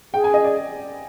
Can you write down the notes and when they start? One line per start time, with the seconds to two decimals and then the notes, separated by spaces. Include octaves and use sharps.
0.14 G#4 G5
0.24 G#5
0.34 D#5
0.44 D5